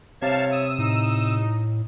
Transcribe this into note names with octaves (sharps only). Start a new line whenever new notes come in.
C3 G3 E4 C#5 F5 A5
D#6 E6
A2 D#4